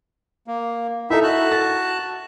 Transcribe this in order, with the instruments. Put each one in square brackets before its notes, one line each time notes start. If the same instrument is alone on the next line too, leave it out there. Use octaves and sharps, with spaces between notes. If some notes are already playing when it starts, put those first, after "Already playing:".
[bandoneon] A#3
[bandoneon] D#4 E5 [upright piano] E4 A4
[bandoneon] F#4 A5 F#6
[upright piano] A6